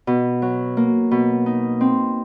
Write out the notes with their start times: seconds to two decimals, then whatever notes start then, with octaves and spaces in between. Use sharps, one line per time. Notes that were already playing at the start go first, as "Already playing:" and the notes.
0.07 B2
0.42 F#3
0.77 A#3
1.11 B2
1.46 D#4
1.81 C4